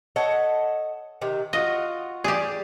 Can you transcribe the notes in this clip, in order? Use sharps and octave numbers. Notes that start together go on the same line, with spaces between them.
A4 C#5 D#5 F#5
C3 D#3
F4 F#4 D#5
G3 G4 G#4